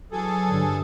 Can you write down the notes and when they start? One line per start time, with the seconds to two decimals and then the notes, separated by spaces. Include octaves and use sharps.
0.12 E3 F#3 G#4 A4
0.45 G2 D3